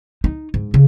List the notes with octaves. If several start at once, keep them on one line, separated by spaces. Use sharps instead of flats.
D#4
G#2
C#3